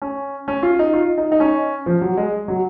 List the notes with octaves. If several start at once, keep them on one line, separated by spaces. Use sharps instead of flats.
C#4
C#4
F4
D#4
F4
D#4
D#4
C#4
F3
F#3
G#3
F#3